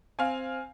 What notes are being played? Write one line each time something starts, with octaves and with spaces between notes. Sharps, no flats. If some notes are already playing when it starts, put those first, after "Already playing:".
C4 F5 G#5